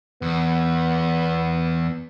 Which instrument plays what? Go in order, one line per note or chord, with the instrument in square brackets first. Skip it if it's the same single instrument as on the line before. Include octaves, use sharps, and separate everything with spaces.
[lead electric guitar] E2 [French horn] B3